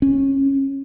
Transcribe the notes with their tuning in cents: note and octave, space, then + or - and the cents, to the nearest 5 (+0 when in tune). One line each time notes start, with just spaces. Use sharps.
C#4 -20